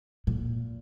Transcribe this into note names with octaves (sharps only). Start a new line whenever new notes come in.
A#2